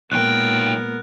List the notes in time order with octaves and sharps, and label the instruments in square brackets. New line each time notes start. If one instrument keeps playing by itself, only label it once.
[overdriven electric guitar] B1 G5 [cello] A#2 G#3 [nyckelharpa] B3 A#4 [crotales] F#6